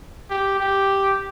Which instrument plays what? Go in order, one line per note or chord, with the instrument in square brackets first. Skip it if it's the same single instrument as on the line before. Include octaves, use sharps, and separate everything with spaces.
[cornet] G4
G4